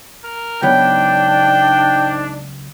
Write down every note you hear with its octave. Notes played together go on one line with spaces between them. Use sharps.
A#4
C#2 G#2 F#3 B3 D4 G5